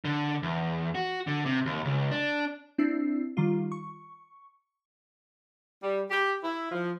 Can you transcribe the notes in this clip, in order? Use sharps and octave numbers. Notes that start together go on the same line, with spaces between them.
D3
E2
F#4
D3
C3
D#2
C#2
D4
C4 D4 E4 E6 C7
D#3 G3 F4
C#6
G3
G4
E4
F3